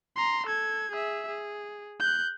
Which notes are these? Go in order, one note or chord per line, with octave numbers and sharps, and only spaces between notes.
A#5 C6
A4 G#6
G#4 E5
G#4
F#6 G6